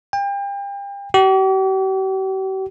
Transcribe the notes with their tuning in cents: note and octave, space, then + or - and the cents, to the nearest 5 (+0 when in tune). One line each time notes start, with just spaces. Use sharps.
G5 +35
G4 -45